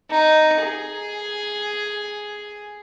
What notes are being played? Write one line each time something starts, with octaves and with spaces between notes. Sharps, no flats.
D#4
G#4